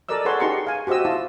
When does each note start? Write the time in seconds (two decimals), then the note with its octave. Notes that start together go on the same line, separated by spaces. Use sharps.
0.09 A4 A#4 D5 D#5 E6
0.25 G#4 A4 B4 C#5 F#5 C6
0.40 D#4 G4 G#4 A#5 C6 C#6
0.67 F5 G#5
0.87 F#4 G4 C5 D#5 E6
1.05 E4 F4 A5